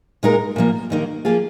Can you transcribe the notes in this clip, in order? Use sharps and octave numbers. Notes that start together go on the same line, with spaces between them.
A#2 G#3 D#4 A#4
A#2 F3 A#3
D#2 D#3 A#3
F3 A#3 F4 G#4